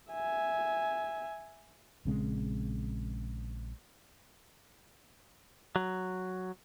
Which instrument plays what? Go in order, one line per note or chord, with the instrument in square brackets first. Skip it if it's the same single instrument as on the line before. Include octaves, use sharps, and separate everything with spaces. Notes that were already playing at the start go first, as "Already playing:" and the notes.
[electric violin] E5 G#5
[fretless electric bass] A#1 C#3 G#3 C4
[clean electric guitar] F#3